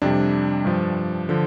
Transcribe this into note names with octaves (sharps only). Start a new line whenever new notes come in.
F2 C3 G3 D4
G2 F3
D3 F3